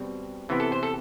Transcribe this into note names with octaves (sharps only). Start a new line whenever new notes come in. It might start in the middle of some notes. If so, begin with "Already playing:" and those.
Already playing: B2 G3 C4
C3 E3 B3
A4
C5
A4